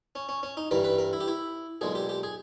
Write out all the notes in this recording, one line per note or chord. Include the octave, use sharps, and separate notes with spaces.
C#4
C#4
C#4
D#4
G2 E3 G3 A#4
B4
A#4
E4
G4
E4
B1 A#2 G#3 G#4
G4
G4
G#4